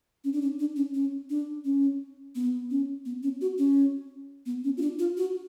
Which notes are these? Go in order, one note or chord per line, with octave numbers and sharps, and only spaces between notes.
C#4
D4
C#4
D4
C#4
C#4
D4
C#4
B3
C#4
B3
C#4
F#4
C#4
B3
C#4
F4
D4
F4
F#4